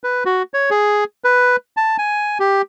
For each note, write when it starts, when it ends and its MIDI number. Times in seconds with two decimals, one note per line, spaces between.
0.04 0.24 71
0.26 0.42 66
0.54 0.70 73
0.70 1.04 68
1.24 1.56 71
1.77 1.97 81
1.98 2.38 80
2.40 2.62 67